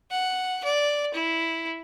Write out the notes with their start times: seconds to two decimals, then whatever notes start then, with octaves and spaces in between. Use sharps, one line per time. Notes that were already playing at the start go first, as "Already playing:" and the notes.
0.11 F#5
0.64 D5
1.14 E4